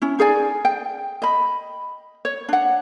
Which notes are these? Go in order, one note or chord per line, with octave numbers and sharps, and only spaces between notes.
C#4 E4
D#4 G#4 D5 G#5
G5
D#5 B5
C#5
D4 F#5